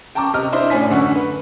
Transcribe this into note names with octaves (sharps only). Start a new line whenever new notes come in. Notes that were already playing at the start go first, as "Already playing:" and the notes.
G5 A5 A#5 C#6 D6
C3 D#5 F6
D4 E4 C5 D#5
A2 C#4 D5 G#5 B6
A1 F#2 D3 F#5 C#6
B4